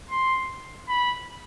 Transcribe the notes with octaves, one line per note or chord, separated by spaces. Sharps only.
C6
B5